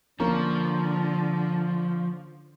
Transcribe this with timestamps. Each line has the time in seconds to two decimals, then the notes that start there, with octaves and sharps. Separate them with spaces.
0.20 D3 F3 A#3 C#4 A#5